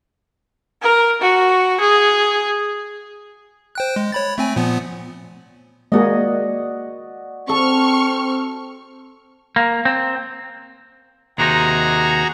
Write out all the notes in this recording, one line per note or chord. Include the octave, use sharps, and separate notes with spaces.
A#4
F#4
G#4
C5 G5 F#6
G#3
C#5 B5 A6
A3 C4 G#5
A#2 F3 B3
G#3 A#3 F#4 G#4 D5 D#5
C4 A4 C#6 F6
A#3
C4
D#2 C3 D#4 F#4 G#4 A#5